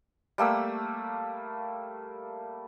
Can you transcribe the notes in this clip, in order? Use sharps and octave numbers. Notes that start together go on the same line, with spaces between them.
G3 A3 A#3 E6